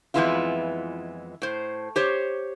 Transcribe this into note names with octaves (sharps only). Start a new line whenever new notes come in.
F2 E3 G#3 B3 E4 F4
A2 C5
G4 C5 C#5